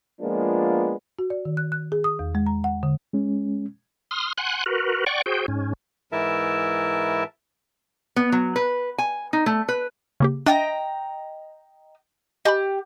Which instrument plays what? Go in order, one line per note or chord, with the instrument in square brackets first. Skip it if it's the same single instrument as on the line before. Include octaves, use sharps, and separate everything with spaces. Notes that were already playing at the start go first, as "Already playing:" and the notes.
[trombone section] F3 G#3 A#3 B3 D4 F4
[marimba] F#4
D5
D#3
F#6
F#6
G#4
D#6
E2
G#3
A#5
F#5
D3
[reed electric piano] G#3 C#4
[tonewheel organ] C6 D#6 F6
F#5 G#5 C6 F#6
F#4 A#4 B4
D5 F#5 G5 C#6
F#4 G#4 C5 G5
G#2 C#4
[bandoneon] G#2 E3 E4 A#4 E5 A5
[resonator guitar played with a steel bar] B3
F#3
B4
G#5
D#4
A3
B4
[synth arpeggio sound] C#3 A#3 G4
[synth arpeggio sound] D4 A6 [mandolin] D#5 G5 A#5
[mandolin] G4 [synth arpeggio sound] D#5 G#5 B5